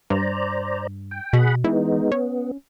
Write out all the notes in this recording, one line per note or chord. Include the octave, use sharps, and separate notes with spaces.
G2 C5 D5 A#5
G5
B2 G#4 F#5 B5
E3 G#3 B3 D#4
B3 C#4